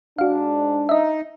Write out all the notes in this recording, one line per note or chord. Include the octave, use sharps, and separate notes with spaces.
G#2 D4 F#4 F5
D#4 D#5 E5